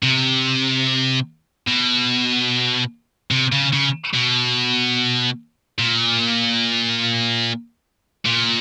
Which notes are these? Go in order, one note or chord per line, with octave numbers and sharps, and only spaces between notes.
C3
B2
C3
C#3
C#3
B2
A#2
A#2